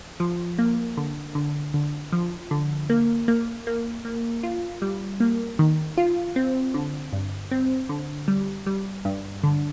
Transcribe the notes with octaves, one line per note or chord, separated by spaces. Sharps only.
F3
A#3
D3
D3
D3
F3
D3
A#3
A#3
A#3
A#3
F4
G3
A#3
D#3
F4
C4
D3
G2
C4
D3
G3
G3
G2
D3